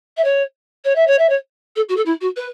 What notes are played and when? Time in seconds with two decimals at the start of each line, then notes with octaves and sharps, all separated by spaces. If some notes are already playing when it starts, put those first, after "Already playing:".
0.17 E5
0.24 C#5
0.85 C#5
0.95 E5
1.07 C#5
1.18 E5
1.29 C#5
1.76 A4
1.89 F#4
1.96 A4
2.06 E4
2.21 F#4
2.36 B4